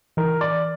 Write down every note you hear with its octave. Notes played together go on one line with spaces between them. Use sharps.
E3 A#4
D5